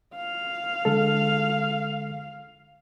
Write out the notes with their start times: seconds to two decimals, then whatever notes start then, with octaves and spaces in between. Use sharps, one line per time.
0.15 F5
0.85 D3 G#3 A4